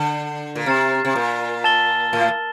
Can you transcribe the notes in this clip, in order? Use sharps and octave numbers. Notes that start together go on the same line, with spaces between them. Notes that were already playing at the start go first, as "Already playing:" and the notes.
Already playing: D3 G6 C7 E7 G7
A#2
C3 A#5 F6 A6 C7 E7
C3
A#2
A5 E6 A6 E7 G7
A2